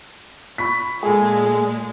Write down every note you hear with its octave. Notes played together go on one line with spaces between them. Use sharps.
B5 C#6 B6
A#2 G#3 G#4 A4